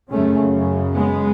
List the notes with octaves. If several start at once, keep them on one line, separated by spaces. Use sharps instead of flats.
F#2 C#3 A3 C#4
G#3 B3